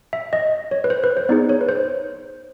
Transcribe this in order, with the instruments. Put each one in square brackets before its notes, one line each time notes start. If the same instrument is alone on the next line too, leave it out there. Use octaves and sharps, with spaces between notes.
[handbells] E5
D#5
C#5
B4
C5
B4
C5
B3 D#4 G#4 D5
C#5
B4
C5